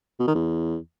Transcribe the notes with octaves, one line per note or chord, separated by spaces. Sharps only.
B2
D#3
E2